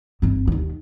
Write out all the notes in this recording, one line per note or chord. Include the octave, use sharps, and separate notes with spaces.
G1 C4
D#2 D#3